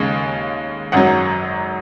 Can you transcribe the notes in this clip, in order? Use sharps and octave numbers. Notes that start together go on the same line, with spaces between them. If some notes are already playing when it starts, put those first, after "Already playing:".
Already playing: D#2 C#3 G#3
G#1 F#2 F#3 F#5